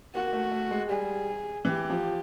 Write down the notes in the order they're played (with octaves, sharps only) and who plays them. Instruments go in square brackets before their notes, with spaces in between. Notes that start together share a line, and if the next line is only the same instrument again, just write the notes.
[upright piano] A#3 [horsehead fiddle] F#4
[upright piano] A3
A3
G#3
[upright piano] G3 [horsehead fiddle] G#4
[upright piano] E3 [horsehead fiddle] G4
[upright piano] F3